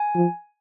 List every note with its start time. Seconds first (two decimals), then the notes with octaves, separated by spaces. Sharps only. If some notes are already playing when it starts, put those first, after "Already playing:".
Already playing: G#5
0.15 F3